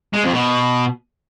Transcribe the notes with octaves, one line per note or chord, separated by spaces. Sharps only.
G#3
F2
B2